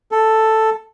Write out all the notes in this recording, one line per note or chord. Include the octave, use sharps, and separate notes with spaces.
A4